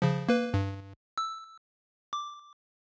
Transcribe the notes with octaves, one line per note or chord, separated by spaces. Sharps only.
C#3 F3
A#3 B4
G2
E6
D6